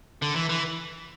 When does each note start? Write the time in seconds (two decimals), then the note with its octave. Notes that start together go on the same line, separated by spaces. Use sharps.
0.22 D3
0.36 E3
0.49 E3